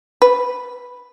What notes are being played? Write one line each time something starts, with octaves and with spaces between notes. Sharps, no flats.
B4